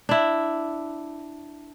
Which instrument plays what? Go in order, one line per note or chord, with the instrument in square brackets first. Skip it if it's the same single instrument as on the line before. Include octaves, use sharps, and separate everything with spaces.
[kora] D4 E4